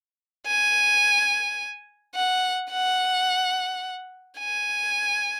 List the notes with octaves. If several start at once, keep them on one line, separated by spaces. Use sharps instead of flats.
G#5
F#5
F#5
G#5